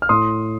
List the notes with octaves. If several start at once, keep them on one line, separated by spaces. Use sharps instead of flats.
F6
A2 C6 D#6